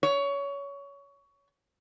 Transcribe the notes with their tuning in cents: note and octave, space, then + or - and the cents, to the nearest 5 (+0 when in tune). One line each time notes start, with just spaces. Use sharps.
C#5 +20